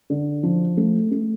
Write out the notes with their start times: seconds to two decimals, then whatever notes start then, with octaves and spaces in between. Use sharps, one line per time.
0.10 D3
0.43 F3
0.77 A3
1.11 A3